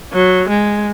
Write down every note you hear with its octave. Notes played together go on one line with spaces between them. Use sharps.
F#3
G#3